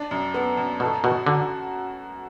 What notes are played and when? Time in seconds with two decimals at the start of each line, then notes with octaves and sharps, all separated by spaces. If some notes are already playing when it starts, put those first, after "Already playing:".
Already playing: D4
0.11 F#2
0.34 B3
0.57 F#2
0.80 B2 A4
1.04 B2 F#4
1.26 D3 F#4